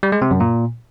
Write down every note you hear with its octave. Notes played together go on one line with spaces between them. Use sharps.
G3
G#3
C3
F#2
A#2